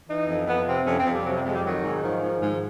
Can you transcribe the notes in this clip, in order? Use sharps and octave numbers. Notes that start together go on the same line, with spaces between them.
E3 D#4
F2
F2 B3
C3 C4
F2 C#4
C4
F2
G3
C3 F#3
G3
F2 G#3
G3
D#3 F#3
G#2
D#3 F3
G#2
G#2